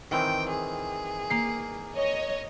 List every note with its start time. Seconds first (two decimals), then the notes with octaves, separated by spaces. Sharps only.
0.11 D#3 E3 C4 G5
0.49 G#4
1.30 A#3 C7
1.96 C#5 D#5